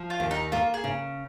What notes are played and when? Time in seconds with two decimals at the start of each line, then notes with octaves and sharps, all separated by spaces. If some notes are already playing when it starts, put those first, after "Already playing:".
Already playing: F3
0.10 F4
0.20 D#2
0.31 D#4
0.52 A#3 F4
0.74 G#4
0.84 C#3